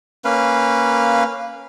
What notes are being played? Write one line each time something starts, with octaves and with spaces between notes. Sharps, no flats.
A#3 C#4 B4 F5